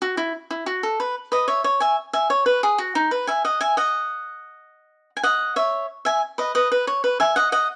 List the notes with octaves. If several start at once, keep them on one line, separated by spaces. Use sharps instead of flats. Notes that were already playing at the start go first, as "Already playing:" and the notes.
F#4
E4
E4
F#4
A4
B4
B4 D#5
C#5 E5
C#5
E5 G#5
E5 G#5
C#5
B4
G#4
F#4
D#4
B4
E5 G#5
D#5 F#5
E5 G#5
D#5 F#5
G#5
D#5 F#5
C#5 E5
E5 G#5
B4 D#5
B4 D#5
B4
C#5
B4
E5 G#5
D#5 F#5
D#5 F#5